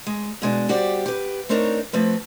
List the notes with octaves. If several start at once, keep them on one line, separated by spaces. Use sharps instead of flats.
G#3
B2 G#3 D4
G3 F#4 G4 C5 D5
G4 B4
A3 C4 D4 D#4 A#4 C#5
F3 A3 C4 B4